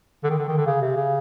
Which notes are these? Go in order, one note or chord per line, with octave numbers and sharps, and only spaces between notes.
D3
D#3
D3
D#3
D3
C#3
C3
C#3